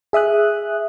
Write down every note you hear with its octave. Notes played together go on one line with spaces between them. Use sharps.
G#4 E5 D#6 F#6